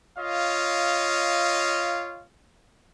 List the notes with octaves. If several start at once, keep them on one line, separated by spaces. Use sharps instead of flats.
F4 C#5 D#5 F5